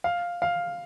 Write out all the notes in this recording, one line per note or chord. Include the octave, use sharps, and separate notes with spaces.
F5
F5